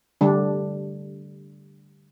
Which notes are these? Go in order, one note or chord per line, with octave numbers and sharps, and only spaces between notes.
D3 G3 D4